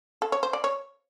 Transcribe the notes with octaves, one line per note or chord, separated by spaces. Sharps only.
A4
C#5
C5
D5
C#5